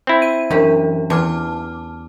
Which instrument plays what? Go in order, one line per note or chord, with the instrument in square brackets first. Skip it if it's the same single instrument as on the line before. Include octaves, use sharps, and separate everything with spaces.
[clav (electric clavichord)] C4 E4
[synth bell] D#7
[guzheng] F#2 G4 [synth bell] E3 D4
[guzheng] E2 [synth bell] A5 D6 F6